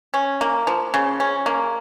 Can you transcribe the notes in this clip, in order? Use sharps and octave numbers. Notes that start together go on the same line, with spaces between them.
C#4
A#3
F3
C#3
C#4
A#3